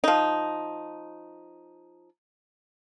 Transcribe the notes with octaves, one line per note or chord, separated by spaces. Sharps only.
F3 D#4